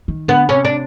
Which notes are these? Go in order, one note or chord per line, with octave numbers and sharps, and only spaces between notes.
D#3
D3 B3
C3 C#4
D4